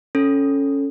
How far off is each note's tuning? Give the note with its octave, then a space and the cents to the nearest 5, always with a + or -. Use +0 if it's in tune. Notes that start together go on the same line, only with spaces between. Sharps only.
C#4 +0 A4 +0